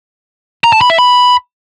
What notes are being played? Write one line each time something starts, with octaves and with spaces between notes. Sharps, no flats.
A#5
A5
B5
E5
B5